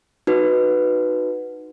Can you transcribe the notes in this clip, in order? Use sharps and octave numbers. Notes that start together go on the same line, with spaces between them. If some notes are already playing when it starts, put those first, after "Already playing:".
D#4 F#4 B4